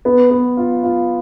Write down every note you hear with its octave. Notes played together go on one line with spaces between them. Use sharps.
B3
B3
F4
F4